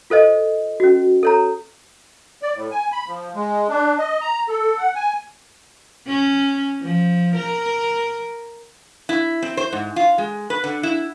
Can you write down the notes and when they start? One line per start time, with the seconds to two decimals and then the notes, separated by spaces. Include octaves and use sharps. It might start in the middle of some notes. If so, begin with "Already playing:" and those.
0.10 F4 A4 C5 D#5
0.80 C#4 F#4
1.23 A4 C#5 A#5
2.42 D5
2.55 A2
2.71 G#5
2.92 B5
3.08 F3
3.35 G#3
3.69 D4
3.99 D#5
4.21 A#5
4.49 A4
4.78 F#5
4.95 G#5
6.07 C#4
6.82 F3
7.36 A#4
9.09 E4
9.42 C4
9.57 C5
9.73 G#2
9.96 F4
10.18 G#3
10.50 B4
10.64 D3
10.83 E4